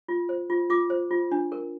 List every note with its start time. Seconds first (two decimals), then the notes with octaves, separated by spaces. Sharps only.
0.08 F4
0.29 C5
0.50 F4
0.70 F4 D6
0.90 C5
1.11 F4
1.32 D4
1.52 A#4